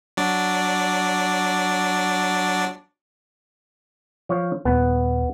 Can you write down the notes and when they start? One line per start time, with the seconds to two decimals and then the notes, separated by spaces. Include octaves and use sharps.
0.17 F#3 D4 D5
4.29 F3 C#5 F5
4.65 D#1 B3